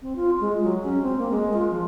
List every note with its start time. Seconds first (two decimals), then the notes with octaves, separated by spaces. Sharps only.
0.01 C4
0.16 F4
0.40 G#3
0.63 F#3
0.83 C#4
1.02 C4
1.18 A#3
1.31 G#3
1.53 F4
1.70 F3